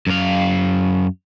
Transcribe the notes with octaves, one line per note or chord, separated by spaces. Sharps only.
F#2 F5